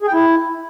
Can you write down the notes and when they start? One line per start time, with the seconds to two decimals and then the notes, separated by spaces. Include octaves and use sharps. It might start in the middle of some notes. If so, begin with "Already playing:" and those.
0.02 G#4
0.08 G5
0.13 E4